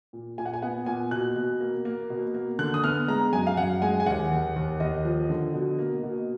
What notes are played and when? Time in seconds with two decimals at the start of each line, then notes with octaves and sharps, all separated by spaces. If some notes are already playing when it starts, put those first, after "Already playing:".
0.13 A#2
0.38 A#2 G#5
0.46 F#5
0.53 G#5
0.62 B3 F#5
0.86 A#2 G#5
1.11 B2 F#6
1.36 B2
1.61 A#3
1.85 A#3
2.10 B2
2.34 A#3
2.59 D3 F#6
2.74 D#6
2.84 B3 F6
3.08 G#3 A#5
3.33 F#2 G#5
3.47 F5
3.57 F#2 F#5
3.82 G#3 G#5
4.00 G#5
4.06 D#2 F#5
4.31 D#2
4.56 D#2
4.80 D#2 D#5
5.05 F3
5.30 D3
5.54 B2
5.79 A#3
6.03 B2